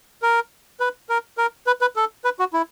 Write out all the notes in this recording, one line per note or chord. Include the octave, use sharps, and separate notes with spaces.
A#4
B4
A#4
A#4
B4
B4
A4
B4
F#4
E4